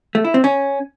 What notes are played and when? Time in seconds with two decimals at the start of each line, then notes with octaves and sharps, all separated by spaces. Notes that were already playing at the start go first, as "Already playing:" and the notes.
0.15 A3
0.25 E4
0.34 C4
0.44 C#4